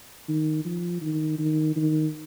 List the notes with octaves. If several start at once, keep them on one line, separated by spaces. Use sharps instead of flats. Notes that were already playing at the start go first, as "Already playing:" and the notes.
D#3
F3
D#3
D#3
D#3